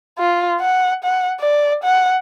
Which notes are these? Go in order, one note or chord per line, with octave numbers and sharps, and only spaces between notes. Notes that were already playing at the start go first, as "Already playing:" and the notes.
F4
F#5
F#5
D5
F#5